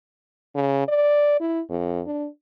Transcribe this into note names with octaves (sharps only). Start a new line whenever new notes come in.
C#3
D5
E4
F2
D4